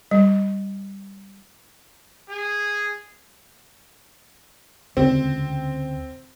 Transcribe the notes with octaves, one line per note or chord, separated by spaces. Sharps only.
G3
G#4
D2 C#3 C4